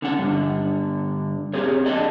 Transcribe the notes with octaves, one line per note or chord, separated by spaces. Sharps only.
D3 C#4 F#5
G2 D3
C4 G4 G#4 C#5
D4 G#4 A4 D5 D#5